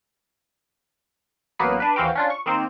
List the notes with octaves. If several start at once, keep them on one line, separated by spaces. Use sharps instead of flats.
A1 F#3 A#3 B3 B4 C7
D4 B4
D#2 E3 C4 F#4 F5 G5
C#4 D4 F4
C#6
D#3 A#3 C4 D#4 C5